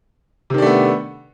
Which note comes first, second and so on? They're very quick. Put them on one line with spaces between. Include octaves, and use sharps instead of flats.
C3 D#3 D4 A3 B3